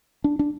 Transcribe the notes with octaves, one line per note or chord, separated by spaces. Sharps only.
D4
D4